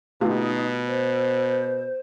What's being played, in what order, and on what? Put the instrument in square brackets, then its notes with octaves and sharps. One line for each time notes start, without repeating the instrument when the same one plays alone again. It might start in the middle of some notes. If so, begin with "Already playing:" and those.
[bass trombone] B2 [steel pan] A3 F4 G4 [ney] D#4
[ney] C5